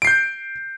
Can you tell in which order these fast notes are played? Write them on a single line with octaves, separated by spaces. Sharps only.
D7 C7 G6